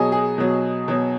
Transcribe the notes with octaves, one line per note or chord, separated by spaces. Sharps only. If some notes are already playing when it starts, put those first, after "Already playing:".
Already playing: B2 F#3 G#4 D#5
G#4
B2 F#3
B2 F#3